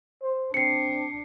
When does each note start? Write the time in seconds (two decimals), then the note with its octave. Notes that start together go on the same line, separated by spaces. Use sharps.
0.22 C5
0.54 C4 D4 C7 C#7